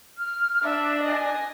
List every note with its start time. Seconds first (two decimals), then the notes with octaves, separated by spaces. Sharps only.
0.19 F6
0.63 D4 E5
1.03 D#5 G#5